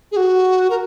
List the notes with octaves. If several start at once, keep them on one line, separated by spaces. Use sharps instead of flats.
G#4
F#4
A#4